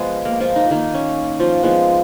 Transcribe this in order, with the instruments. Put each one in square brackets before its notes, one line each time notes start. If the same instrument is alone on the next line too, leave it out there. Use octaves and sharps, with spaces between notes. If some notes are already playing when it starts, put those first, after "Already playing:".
Already playing: [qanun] F3 G#3 B3 G#4
A#3 A#4
F3 F4
D#4
D#3 A#3 D#4
C#4
F3 F4
F3 G#3 B3